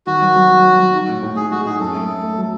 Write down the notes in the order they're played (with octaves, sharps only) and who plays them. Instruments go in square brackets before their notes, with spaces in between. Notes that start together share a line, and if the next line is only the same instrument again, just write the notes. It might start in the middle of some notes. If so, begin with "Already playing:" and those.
[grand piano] D#3 [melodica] F#4
[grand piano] F#3
F#3
F#3
F#3
F#3
D#4
A2
A2
[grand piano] D#4 [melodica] G#4
[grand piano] G#3 [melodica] F#4
[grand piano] D#4 [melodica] G#4
[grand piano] F#2 [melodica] A4
[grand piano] A3
A3
A3
F#3